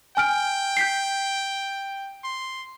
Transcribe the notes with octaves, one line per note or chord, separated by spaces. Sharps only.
G5 G#5 F6 D7
G6 B6 C7
C6